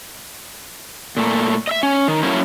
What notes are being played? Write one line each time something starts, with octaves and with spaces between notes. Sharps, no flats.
A#2 A3
D#5 E5
C#4
D#3
F#3 A3 A#3 C#4 E4